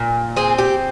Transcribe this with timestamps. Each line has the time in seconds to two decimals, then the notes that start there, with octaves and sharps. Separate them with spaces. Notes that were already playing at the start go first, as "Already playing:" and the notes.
Already playing: A#2
0.36 C4 G#4
0.58 G4